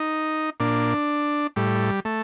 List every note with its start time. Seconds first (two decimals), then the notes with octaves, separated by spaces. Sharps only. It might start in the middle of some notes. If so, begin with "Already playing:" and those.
Already playing: D#4
0.60 A#2 D4
1.56 A2 G3
2.05 A3